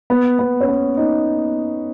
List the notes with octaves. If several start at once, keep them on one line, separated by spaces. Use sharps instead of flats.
B3
B3
C#4
B3
D#4